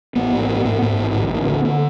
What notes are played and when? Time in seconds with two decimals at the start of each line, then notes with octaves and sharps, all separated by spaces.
0.15 A1 B3
0.32 G#2
0.48 G#2
0.65 G#2
0.82 G#2
0.99 A1
1.15 D2
1.32 D2
1.48 D3
1.65 D3